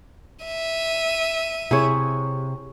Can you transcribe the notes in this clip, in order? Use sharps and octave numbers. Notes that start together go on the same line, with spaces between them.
E5 D#7
C3 E4 G#4 C#5